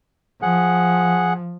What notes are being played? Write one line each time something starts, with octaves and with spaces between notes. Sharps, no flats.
F3 G#4 F#5